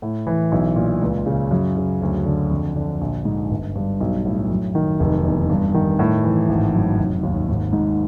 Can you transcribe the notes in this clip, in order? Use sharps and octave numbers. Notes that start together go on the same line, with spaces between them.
A2
E3
B1
A#2
C#2
C#3
F#2
C#3
D2
D3
F2
D3
A#1
G#2
G1
G2
B1
A2
F#2
D#3
F1
E2
G2
D#3
A2
E3
G#1
F#2
F1
D#2
G#1
G#2